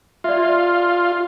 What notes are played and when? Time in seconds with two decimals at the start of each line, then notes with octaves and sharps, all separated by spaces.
0.24 F4 D5 E5